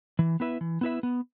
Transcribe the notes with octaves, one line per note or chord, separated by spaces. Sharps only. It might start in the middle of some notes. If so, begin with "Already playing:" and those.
E3
B3 E4 B4 E5
E3
B3 E4 B4 E5
B3